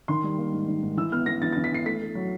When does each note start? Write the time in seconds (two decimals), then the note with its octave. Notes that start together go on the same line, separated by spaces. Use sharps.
0.08 D#3 C6
0.23 G3
0.38 A#3
0.52 G#2
0.68 D#3
0.82 G#2
0.97 E3 E6
1.12 B3 F6
1.26 B3 A#6
1.42 E3 A6
1.52 A6
1.57 E3
1.64 B6
1.72 E3 C7
1.86 A3 B6
2.01 A3
2.15 F#3